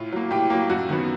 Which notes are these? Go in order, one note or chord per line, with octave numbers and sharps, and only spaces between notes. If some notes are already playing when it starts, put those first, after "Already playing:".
Already playing: A2 F4
F#3 A#3
A2 G4
F#3 A#3
F#2 F#4
D#3 F#3 B3